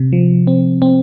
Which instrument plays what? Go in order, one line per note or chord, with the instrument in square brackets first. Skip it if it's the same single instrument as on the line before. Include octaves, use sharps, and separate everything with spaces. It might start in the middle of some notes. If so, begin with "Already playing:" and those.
Already playing: [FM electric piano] C3
F3
C4
C4